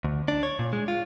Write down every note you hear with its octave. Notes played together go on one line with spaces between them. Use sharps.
D2
D4
C#5
A#2
G#3
F4